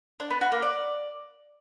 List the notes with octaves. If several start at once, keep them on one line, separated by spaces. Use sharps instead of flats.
D4
B3
F#4
A#3
D5